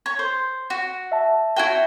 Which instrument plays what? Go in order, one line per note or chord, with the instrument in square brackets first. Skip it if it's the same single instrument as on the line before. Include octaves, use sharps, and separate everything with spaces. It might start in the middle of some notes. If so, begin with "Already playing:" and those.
[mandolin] C#5
C5
F#4
[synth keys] E5 A5
[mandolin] E4 F#4 G5